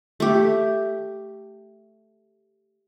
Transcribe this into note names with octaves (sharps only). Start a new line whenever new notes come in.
A3 G4